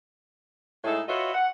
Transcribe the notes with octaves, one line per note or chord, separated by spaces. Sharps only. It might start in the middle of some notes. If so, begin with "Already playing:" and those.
A2 G#3 D#4 E4 G#4 A4
F4 F#4 B4 C#5 D#5 E5
F#5